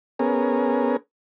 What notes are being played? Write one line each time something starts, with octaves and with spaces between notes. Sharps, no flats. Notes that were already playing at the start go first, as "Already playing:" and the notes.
B3 C#4 G#4 A#4